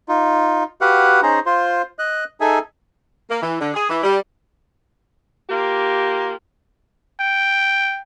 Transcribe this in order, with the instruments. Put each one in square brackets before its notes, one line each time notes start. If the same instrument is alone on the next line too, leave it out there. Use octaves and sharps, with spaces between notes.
[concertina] D#4 F4
F#4 G4 B4 F5 F#5
C#4 D#4 G#4 C5 A#5
F4 C5
D#5 F#6
D#4 G#4 A4 E5 G#5
[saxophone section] A#3
E3
D3
G#4
E3
G3
A#3 F4 G4
[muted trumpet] G5